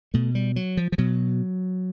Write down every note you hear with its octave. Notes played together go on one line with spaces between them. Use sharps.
B2 A3
G3
F#3
F3
F3
B2 F#3